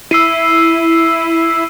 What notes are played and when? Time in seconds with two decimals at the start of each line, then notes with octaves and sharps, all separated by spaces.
0.11 E4 E6 C7 D#7